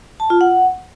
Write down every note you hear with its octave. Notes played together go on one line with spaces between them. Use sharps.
A5
F4
F#5